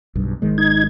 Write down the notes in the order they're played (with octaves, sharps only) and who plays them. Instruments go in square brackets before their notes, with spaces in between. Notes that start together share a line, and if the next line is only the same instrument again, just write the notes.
[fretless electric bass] B1 G2
G#1 D#3 G#3
[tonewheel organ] D#4 G#6